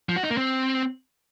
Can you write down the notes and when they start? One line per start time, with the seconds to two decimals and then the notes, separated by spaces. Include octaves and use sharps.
0.09 F3
0.16 F#4
0.23 D#4
0.30 A#3
0.37 C4